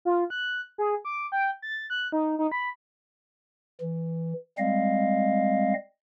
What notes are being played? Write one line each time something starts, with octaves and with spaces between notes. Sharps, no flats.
F4
F#6
G#4
D6
G5
A6
F#6
D#4
D#4
B5
E3
G3 G#3 C4 D#5 F5